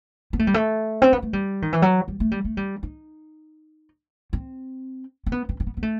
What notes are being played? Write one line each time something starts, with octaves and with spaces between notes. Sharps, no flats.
B3
A3
G3
A3
C4
B3
A3
G3
D#3
E3
F#3
G3
A3
G3
A3
G3
D#4
C4
C4
B3
C4
C4
B3
B3
A3